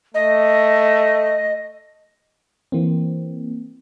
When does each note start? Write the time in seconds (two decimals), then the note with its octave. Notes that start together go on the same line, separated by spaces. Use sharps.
0.14 A3 D#5
2.72 E3 A#3 C4